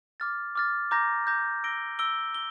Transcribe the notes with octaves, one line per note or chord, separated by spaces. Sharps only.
D6 F6 A6
D6 F6 A6
A#5 D6 G6 A#6
A#5 D6 G6 A#6
E6 A#6 D7 G7
E6 A#6 D7 G7
G7